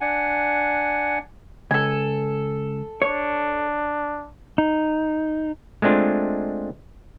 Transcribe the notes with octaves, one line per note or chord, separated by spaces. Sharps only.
D4 F#5 G#5
C#2 A4 G#5
D4 C#5
D#4
G#3 A3 C4 D4 F4